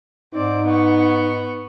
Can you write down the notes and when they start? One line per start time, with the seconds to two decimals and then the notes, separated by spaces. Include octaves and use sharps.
0.34 G#2 C4 D#4 D5
0.66 B3 C#6